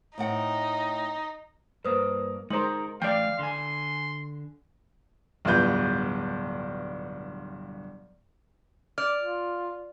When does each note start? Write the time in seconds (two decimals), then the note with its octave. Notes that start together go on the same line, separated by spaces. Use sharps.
0.18 A2 C4 D#4 F#5
1.85 G2 A#3 B4 C5 D#6
2.50 G#3 D#4 A#4 C5 F#7
3.02 E3 A3 D5 F5 G5
3.39 D3 G#5 C6
5.45 D1 G2 B2 F4 B4 G6
8.98 D5 F6
9.21 F4